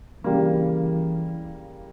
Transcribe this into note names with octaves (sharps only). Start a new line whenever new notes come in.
C#3 E3 G3 A#3